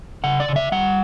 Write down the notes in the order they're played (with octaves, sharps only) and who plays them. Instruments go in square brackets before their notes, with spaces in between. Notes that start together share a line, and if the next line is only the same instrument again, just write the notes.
[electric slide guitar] C#3 F#5
D5
C#3
E5
G3 F#5